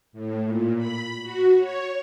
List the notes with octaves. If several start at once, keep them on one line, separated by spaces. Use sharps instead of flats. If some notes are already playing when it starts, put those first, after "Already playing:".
A2
A#2
B5
F#4
C#5